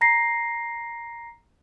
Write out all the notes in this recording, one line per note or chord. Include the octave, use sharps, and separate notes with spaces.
A#5 A#6 C7